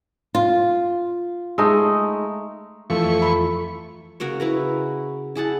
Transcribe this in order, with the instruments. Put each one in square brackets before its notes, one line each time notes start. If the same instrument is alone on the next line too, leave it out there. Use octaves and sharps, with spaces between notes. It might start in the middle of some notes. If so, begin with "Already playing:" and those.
[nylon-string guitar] F4
[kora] G#3 A3 D#4
[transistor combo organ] F2 E3 C#6 [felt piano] A3 [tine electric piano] F4 A4
[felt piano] B5
[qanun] C#3 F#4 A#4 C#5
E4 B4 A#5
E4 G#4 F#5 A5